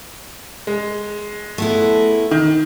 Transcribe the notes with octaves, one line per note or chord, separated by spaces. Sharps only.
G#3
A3 B3 E4
D#3